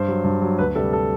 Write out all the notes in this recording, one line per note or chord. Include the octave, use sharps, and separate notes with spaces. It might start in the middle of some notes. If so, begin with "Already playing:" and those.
Already playing: G2 C5
F#3
G2
F#3
D2 B4
C3 G3 A4
A4